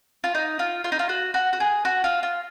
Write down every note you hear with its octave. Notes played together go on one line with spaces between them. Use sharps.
F4
D#4
F4
F4
D#4
F4
F#4
F#4
F#4
G#4
F#4
F4
F4